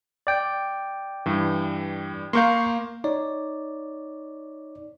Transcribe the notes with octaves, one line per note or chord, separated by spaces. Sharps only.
D5 G5
G2 E3
A#3 A#4 F5 C6 C#6 G6
D#4 C#5 D5